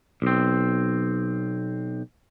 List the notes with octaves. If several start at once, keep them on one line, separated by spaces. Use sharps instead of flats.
B1 C4